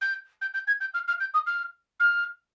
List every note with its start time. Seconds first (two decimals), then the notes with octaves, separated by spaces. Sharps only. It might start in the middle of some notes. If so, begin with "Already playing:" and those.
0.01 G6
0.41 G6
0.54 G6
0.67 G#6
0.80 G6
0.94 F6
1.07 F6
1.20 G6
1.34 D#6
1.46 F6
1.99 F6